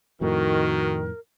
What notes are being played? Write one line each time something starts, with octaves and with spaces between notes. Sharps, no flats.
F2 A2 D#3 F#4 A#4